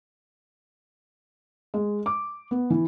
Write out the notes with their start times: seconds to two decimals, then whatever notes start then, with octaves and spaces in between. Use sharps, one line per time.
1.74 G#3
2.06 D6
2.51 B3
2.70 E3